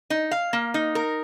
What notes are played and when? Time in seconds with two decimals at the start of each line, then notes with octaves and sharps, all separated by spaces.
0.10 D#4
0.31 F5
0.53 A#3
0.74 D#4
0.95 A#4